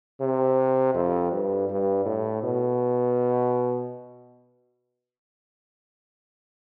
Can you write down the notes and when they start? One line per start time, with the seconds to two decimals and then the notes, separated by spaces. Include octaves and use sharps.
0.21 C3
0.94 F2
1.32 G2
1.69 G2
2.05 A2
2.43 B2